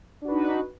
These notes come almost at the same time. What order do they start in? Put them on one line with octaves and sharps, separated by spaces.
D4 F#4 B4 D#4